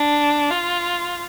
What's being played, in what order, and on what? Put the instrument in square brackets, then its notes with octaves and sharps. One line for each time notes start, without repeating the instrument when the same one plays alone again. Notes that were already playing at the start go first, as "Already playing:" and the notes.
Already playing: [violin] D4
F4